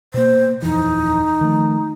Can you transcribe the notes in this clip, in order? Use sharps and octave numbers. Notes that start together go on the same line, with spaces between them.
B2 A#3 C5
D#1 F2 E3 D#4
D#3 F3 A3